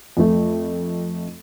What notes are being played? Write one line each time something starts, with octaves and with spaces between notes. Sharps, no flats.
F2 A3